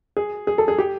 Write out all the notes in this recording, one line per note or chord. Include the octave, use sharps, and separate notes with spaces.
G#4
G#4
A4
G#4
G4